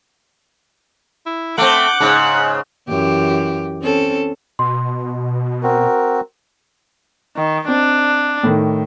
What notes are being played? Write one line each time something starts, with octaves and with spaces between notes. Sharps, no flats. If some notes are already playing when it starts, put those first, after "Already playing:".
E4
A3 C4 F#5 D6 G6
G#2 C#3 F#6
F#2 E3 G4
C4 C#4 A4
B2 C6
C4 F#4 A#4
D#3
C4 D4
A2 D#3